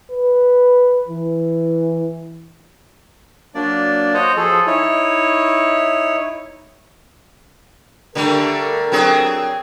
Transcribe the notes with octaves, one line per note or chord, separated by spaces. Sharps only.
B4
E3
F#3 A#3 D4 D5
F#4 C5 C#5 D#5
F3 G#4 A4
D#4 E4 C#5
D3 G3 A3 A4 A#4
F#3 C4 G#4